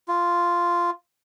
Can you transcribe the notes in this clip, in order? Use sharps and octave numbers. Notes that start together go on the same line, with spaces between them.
F4